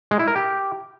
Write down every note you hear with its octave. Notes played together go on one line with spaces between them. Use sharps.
G#3
E4
A#4
G4